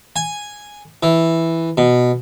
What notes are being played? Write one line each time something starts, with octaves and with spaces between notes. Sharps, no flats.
G#5
E3
B2